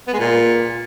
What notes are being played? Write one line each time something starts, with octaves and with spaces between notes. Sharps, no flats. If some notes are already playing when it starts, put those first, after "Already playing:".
B3
G#3
A#2